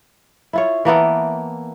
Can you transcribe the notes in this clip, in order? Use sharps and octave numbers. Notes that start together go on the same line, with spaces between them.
E4 F4 C#5
E3 A#3 B3 A4